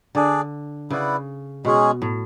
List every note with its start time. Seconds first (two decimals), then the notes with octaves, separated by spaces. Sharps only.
0.15 D3 D4 G#4 D5
0.90 C#3 E4 B4 D5 F#5
1.65 B2 G#3 C#4 G#4
2.02 A2